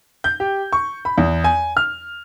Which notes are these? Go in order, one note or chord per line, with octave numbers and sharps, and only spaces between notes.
G6
G4
C#6
B5
E2
G#5
F6